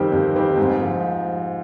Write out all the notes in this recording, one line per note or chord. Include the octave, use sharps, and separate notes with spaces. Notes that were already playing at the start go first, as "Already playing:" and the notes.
Already playing: F2 D#3 G3 C4 G4
F2
D#3 G3 C4 G4
G#2
F3